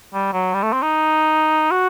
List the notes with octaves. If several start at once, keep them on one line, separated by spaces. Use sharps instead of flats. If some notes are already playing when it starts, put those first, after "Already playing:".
G3
F#3
G3
A3
C4
D#4
F#4